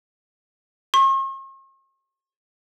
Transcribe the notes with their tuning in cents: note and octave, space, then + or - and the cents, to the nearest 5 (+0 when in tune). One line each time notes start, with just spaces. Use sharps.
C#6 -45